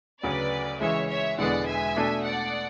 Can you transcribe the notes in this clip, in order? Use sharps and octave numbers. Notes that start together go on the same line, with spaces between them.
D2 C#3 F#3 B4 D5
C#3 E3 G#3 C#5 E5
C#5 E5
E1 E2 D3 G#3 B3 D5 F#5
E5 G#5
B2 A3 D4 A4
D5 F#5